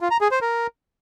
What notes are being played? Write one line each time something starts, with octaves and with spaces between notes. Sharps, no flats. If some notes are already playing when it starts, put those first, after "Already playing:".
F4
A#5
G#4
C5
A#4